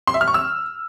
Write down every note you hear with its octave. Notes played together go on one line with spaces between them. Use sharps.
C6
E5
F6
C#6
E6